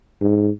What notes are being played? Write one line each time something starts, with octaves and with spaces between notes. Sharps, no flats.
G#2